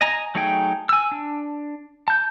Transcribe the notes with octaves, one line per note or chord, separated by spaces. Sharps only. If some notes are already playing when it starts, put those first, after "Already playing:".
D#5 G#5 A#5
F#3 A3 D#4 G#4 G5
G#5 E6
D4
A5 G6